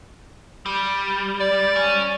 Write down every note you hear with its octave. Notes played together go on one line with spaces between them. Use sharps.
G3
D5
C#4